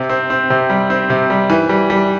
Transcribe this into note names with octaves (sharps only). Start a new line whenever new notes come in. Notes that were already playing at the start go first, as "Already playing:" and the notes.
Already playing: C3
C4
C4
C3
G3
C4
C3
G3
E3
G3
G3